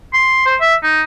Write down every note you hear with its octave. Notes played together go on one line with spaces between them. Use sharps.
C6
C5
E5
D#4